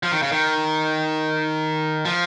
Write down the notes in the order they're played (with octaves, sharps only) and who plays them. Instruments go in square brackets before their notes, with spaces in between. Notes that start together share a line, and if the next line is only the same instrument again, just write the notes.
[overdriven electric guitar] F3
D#3
C#3
D#3
F3